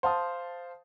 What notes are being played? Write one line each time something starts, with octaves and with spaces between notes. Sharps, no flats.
C5 F5 A5 D#6